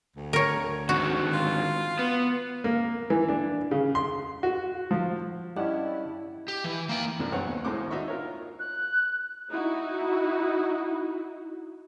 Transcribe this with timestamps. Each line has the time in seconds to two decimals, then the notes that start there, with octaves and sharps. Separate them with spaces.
0.16 D2
0.33 A#4 C#5
0.89 G#2 D3 D#3 F#4
1.33 F4
1.99 B3
2.64 A#3
3.10 E3
3.28 D4
3.71 C#3
3.95 C6
4.43 F#4
4.91 F3
5.57 G2 C#4 E4 G4 D5 D#5 F#5
6.48 G4
6.64 E3
6.89 A#3 G5
7.19 C2 F#2 D4
7.32 B1 G2 G#3 C4 C#5 F#5
7.47 D#2
7.65 D#2 A2 C3 G#3 C5 D6
7.91 D4 D#4 F#4 E5 C#6
8.08 F4 A#4 C#5
8.59 F#6
9.49 D#4 E4 F#4